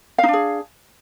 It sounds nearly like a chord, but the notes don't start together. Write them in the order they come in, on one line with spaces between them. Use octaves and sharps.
F5 D#4 D4 G#4